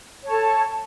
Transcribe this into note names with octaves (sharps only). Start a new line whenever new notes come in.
A4 C#5 A5